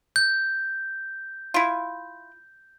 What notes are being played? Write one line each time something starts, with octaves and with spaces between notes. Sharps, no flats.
G6
E4 F4